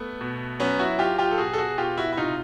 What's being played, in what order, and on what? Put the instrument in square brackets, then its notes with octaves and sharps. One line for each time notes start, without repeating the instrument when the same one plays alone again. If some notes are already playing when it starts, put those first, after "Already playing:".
Already playing: [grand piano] A3 B3
B2
F#3 B3 C#4
E4 F#4
F#3 F4 G4
F4 G4
A4
B2 F#4 G#4
A4
F#4 G#4
B2 F4 G4
E4 F#4
E4
C3 D#4 F4